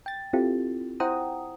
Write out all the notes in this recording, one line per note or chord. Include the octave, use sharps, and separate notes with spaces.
G5 A6
C4 E4 F4 G4 A4
E4 C5 F#5 G5 A#5 D#6